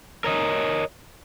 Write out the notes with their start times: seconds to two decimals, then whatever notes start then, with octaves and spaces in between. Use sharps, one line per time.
0.24 A#4 C#5 D#5